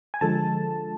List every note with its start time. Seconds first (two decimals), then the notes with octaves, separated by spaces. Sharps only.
0.14 G#5
0.21 D3 F3 G#3 A4 A5